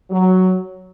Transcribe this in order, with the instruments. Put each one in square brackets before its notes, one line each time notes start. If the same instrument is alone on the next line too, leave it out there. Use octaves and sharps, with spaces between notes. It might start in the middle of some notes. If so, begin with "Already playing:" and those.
[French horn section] F#3